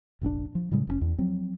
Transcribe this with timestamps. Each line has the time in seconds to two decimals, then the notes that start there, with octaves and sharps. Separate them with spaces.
0.21 F1 A#1 C4 D4
0.55 F3
0.71 A2 C#3 G3 G#3
0.87 F1 C3 C#4
1.01 E2
1.18 F3 F#3 C4